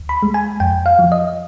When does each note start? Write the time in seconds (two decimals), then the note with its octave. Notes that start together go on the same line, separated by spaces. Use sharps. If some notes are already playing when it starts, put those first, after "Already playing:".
Already playing: D2
0.09 B5
0.23 G#3
0.34 G#5
0.60 F2 G5
0.86 F5
0.99 F3
1.12 D#5